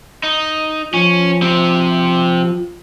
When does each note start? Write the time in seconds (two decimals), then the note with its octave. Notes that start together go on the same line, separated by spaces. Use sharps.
0.24 D#4
0.94 F3 C#4
1.42 C3 C4